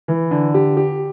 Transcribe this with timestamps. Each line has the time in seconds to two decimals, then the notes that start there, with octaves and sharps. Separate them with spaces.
0.08 E3
0.31 D3
0.54 G4
0.77 G4